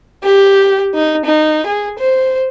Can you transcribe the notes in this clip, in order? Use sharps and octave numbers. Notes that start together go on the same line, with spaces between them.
G4
D#4
D#4
G#4
C5